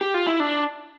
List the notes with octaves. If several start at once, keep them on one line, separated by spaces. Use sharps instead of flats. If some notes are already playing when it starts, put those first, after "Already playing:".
G4
F4
E4
D4